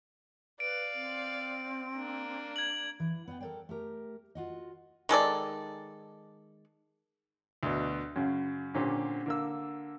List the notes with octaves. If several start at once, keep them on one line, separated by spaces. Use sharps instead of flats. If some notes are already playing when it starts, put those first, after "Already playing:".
B4 D5 F5 D7
C4
A#3 D4
G#6 F#7
E3
B3 D5 F5 G5
A4 A#4 C5 D5 G5
A3 G4 A#4
F4 F#4 D#5
D#3 G#3 A4 D5
D2 B2
F#2 C#3
A#2 D3 C4 C#4 G4
D3 A#3 E6